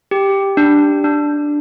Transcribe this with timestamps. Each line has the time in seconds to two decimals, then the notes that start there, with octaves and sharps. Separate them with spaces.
0.11 G4
0.57 D4
1.04 D4